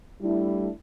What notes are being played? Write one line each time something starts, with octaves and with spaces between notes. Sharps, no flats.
G3 A3 D4 E4